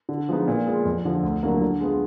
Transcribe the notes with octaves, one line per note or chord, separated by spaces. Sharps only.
D3
F3 G#3 B3 D#4
A#2
G#3 B3 F4
F2
D3 F3
D2
D3 F#3 A#3
D3
G#3 B3 F4